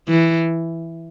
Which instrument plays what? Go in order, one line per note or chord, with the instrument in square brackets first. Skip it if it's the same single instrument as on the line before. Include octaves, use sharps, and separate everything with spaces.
[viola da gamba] E3